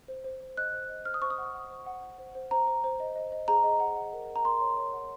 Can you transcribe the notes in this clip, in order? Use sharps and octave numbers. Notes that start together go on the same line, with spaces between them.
C5
C5
C5
D#5 F#6
C5
D#5
C5 F6
D#6
C5 C#6
D#6
F#5
F#5
C5
F#5
F#5
C5
C5
C5 A#5
C5
C5
D#5
D#5
D#5
G#4 A#5
D#5
F#5
F#5
A#4
A#4
A#5
A#4 C6
C#5
C#5
F#5